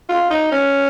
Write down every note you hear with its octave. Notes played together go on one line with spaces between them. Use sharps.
F4
D#4
C#4